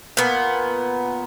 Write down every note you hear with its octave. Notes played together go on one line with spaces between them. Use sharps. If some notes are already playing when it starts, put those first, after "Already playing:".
A#2 B3